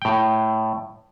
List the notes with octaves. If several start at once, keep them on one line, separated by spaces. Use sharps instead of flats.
A2 G5